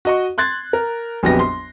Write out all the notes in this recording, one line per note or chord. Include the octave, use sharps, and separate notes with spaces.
F#4 D#5 C#6
C6 F#6 G#6 A6
A#4
A#1 F2 F#3 B3 G4 A#6
C6